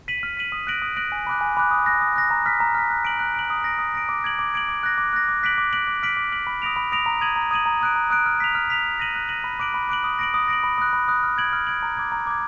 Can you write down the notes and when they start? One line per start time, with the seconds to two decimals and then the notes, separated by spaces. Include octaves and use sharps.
0.08 B6 D#7 F#7
0.23 F6
0.37 B6 D#7 F#7
0.52 D#6
0.67 F#6 A#6 D7 F#7
0.82 D#6
0.97 F#6 A#6 D7 F#7
1.12 G#5
1.27 B5 D6 F#6
1.41 G#5
1.57 B5 D6 F#6
1.71 D#6
1.86 F#6 A#6
2.01 D#6
2.16 F#6 A#6
2.30 A#5
2.46 F6 B6
2.60 A#5
2.75 F6 B6
2.90 F#6
3.05 D7 F#7
3.19 F#6
3.35 D7 F#7
3.50 D#6
3.64 A#6 D7
3.79 D#6
3.95 A#6 D7
4.09 D6
4.24 G#6 D7 F#7
4.39 D6
4.54 G#6 D7 F#7
4.69 D6
4.83 F#6 A#6
4.98 D6
5.13 F#6 A#6
5.28 D6
5.43 F#6 B6 D7 F#7
5.58 D6
5.73 F#6 B6 D7 F#7
5.87 D6
6.03 F6 B6 D7 F#7
6.17 D6
6.32 F6 B6 D7 F#7
6.47 B5
6.62 D#6 A#6 D7 F7
6.76 B5
6.92 D#6 A#6 D7 F7
7.06 A#5
7.21 D#6 G#6 D#7 F#7
7.36 A#5
7.51 D#6 G#6 D#7 F#7
7.66 A#5
7.81 D#6 F#6 D7
7.96 A#5
8.10 D#6 F#6 D7
8.26 F6
8.40 B6 F7
8.55 F6
8.70 B6 F7
8.85 F#6
9.00 A#6 D#7 F#7
9.15 F#6
9.29 A#6 D#7 F#7
9.44 B5
9.60 D6 F#6 D7 F#7
9.74 B5
9.89 D6 F#6 D7 F#7
10.04 D#6
10.19 A#6 D7 F#7
10.34 D#6
10.48 A#6 D7 F#7
10.64 B5
10.78 D#6 F#6
10.93 B5
11.08 D#6 F#6
11.23 F6
11.38 G#6 D7 F#7
11.53 F6
11.67 G#6 D7 F#7
11.83 A#5
11.97 D6 G#6
12.12 A#5
12.27 D6 G#6